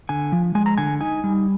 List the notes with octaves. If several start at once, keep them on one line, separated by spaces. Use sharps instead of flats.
D3 G#5
F3
G#3 G#5
A#5
D3 G#5
D#4 G#5
G3